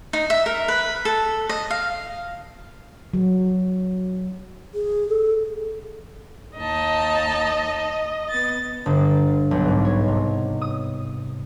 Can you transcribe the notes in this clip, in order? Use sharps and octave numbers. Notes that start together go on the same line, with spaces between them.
D#4
E5
A#4
B4
A4
D#5
F5
F#3
G#4
A4
D#2 D#4 D#5 A5
B3 A6
G1
B1
G#2
C#5
C3
D#6